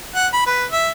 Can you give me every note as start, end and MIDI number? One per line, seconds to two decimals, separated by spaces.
0.15 0.27 78
0.33 0.44 83
0.46 0.65 71
0.72 0.90 76